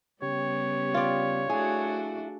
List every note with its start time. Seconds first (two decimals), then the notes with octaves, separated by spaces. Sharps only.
0.22 C#3 G3 B3 G4 C#5
0.94 F4 D5
1.50 A3 D4 E4 F#4 G#4